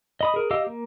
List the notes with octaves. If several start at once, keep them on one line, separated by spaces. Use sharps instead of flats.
D#5 B5 D#6
G#4 A#4
G4 D#5 F5 E6
A#3